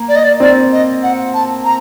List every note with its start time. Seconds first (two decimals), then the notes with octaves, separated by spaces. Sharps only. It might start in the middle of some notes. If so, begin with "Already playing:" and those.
Already playing: A#3
0.09 D5
0.16 D#5
0.23 D5
0.40 C4 D5
0.72 D#5
1.03 F#5
1.34 A5
1.65 A#5